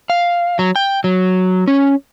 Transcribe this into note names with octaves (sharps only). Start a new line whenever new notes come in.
F5
F#3
G5
F#3
C#4